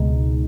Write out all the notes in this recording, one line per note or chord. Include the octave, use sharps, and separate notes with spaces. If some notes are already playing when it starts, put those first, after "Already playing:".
Already playing: C#2 B2 G#3 D#4